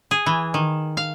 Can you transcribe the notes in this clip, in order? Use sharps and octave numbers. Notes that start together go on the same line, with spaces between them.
G#4
E3
D#3
F5